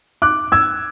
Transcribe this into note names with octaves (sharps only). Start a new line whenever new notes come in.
D6 F#6
E6 G#6